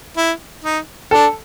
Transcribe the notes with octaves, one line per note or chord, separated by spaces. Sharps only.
E4
D#4
D4 A4